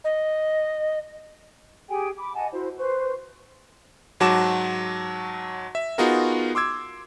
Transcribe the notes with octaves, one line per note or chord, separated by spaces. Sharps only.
D#5
G4 G#4 G5 G#5
B5 D6
D#5 F#5 G#5 A5
E4 F#4 C5
B4 C5 C#6
G#2 F#3 F#4 A5 D6 E7
E5
B3 D#4 F4 F#4 G#4 A#4
C6 D6 E6 G#6